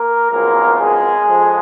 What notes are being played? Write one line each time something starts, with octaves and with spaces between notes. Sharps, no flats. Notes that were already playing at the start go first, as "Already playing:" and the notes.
Already playing: A#3 A#4
G#1 F#2 F3 G#3 A#3 B3 A#4
G#3 G#4
F2 F3 G#3